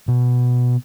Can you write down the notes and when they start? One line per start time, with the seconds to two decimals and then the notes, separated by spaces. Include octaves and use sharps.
0.08 B2